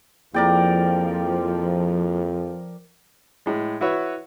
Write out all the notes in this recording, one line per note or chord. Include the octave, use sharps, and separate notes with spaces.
F2 F3 A#3 E4 G#4 A#4 D5 G5
A2 G#3
E4 F#4 B4 C#5 E5